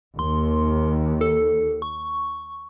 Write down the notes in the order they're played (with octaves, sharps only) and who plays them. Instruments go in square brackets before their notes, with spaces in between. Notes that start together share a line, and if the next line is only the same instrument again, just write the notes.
[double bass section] D#2 [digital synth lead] C6
[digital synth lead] A4
C#6